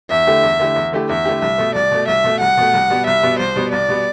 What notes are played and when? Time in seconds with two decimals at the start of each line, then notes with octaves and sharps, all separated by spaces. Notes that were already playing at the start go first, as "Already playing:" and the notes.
0.10 E2 E5
0.27 D3 A3 E4 G4
0.43 E2
0.59 D3 A3 E4 G4
0.76 E2
0.92 D3 A3 E4 G4
1.09 E2 E5
1.25 D3 A3 E4 G4
1.42 C2 E5
1.58 B2 A3
1.75 C2 D5
1.91 B2 A3
2.08 C2 E5
2.24 B2 A3
2.40 C2 F#5
2.57 B2 A3
2.73 C2
2.90 B2 G3 B3
3.07 C2 E5
3.23 B2 G3 B3
3.39 C2 C5
3.56 B2 G3 B3
3.72 C2 D5
3.89 B2 G3 B3